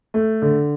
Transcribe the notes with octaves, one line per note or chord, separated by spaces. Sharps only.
A3
D3